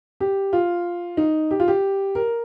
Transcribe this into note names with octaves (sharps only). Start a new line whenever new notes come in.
G4
F4
D#4
G4
F4
G4
A#4